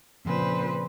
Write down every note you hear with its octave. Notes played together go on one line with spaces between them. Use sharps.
A#2 C#3 F3 C4 B4 C5